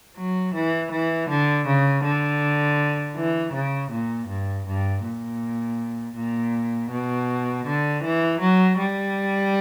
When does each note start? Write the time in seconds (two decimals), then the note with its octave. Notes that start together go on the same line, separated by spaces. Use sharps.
0.16 F#3
0.54 E3
0.91 E3
1.29 D3
1.66 C#3
2.03 D3
3.16 E3
3.53 C#3
3.91 A#2
4.28 G2
4.67 G2
5.04 A#2
6.16 A#2
6.90 B2
7.66 D3
8.03 E3
8.41 F#3
8.78 G3